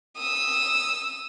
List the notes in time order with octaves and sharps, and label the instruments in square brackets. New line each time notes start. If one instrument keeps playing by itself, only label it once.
[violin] D#6 E6